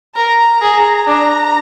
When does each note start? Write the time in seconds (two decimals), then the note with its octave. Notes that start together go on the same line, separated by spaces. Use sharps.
0.16 A#4 A#5
0.62 G#4
1.07 D4 A#5